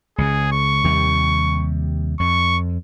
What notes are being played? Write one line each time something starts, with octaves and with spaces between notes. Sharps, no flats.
C#2 C#3 G#4
C#6
D#2 C3 G3
F2 C#6